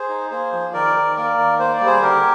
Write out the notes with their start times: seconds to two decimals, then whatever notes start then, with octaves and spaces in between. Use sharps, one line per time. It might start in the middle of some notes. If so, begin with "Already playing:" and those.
Already playing: G#4 C5
0.09 D#4
0.30 A#3 G#4 C5
0.53 F3
0.73 D#3 A#4 D5
0.95 D#3
1.16 A#3 A#4 D5
1.38 D#3
1.59 A#3 C5
1.73 D5
1.81 G3
1.86 G#4 C5
2.02 D3 G4 A#4